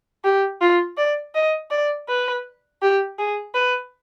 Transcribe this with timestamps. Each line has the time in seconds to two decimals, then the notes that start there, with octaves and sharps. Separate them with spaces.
0.24 G4
0.61 F4
0.97 D5
1.35 D#5
1.71 D5
2.09 B4
2.82 G4
3.19 G#4
3.54 B4